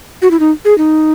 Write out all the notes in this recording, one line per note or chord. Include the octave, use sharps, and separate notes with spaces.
F#4
E4
D#4
G#4
D#4